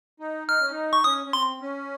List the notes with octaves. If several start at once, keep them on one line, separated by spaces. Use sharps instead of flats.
D#4
D#4 F6
C#4
D#4
C#6
C#4 D#6
C#4
C4 C6
C#4